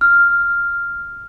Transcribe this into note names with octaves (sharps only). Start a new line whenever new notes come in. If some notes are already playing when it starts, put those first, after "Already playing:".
F6